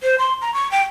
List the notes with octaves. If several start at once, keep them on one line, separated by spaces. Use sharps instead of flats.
C5
C6
A#5
C#6
G5